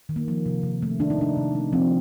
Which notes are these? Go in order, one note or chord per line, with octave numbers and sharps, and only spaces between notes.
D#3
A#3
F3 A#3
C3
C3
A3
D#3 D4
D#4
C3 D4
C3
A3
F3 C4